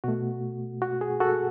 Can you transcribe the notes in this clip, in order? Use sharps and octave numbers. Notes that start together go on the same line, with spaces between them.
B2 A3 F#4
F#4
G#4
F#4 A4